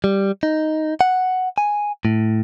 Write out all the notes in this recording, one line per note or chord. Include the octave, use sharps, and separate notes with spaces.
G3
D#4
F#5
G#5
A2